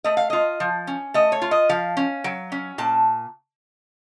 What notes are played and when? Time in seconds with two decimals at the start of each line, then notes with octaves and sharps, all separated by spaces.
0.04 A3 D#5
0.17 F5
0.30 F4 D#5
0.60 F3
0.87 C#4
1.14 A3 D#5
1.32 C#5
1.42 F4
1.51 D#5
1.69 F3 F5
1.97 C#4
2.24 F#3
2.52 C#4
2.78 A#2 A5